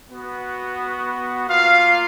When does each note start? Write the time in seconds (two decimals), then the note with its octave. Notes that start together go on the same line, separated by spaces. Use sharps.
0.10 B3 F#4
1.50 A#3 F4 F5